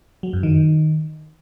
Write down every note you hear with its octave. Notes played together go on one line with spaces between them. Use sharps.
F#3
F#2
D#3